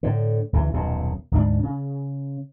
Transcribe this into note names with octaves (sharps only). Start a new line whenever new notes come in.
A2 D3
D2 C#3 E3
D#1 B1 F#2 B2
D2 G#2 D4
C#3